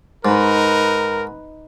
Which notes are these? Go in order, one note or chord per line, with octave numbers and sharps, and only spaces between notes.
G#2 D#4 A#4 B4